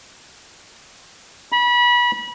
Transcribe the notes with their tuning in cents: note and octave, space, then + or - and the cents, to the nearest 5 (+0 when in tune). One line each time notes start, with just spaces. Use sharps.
B5 -30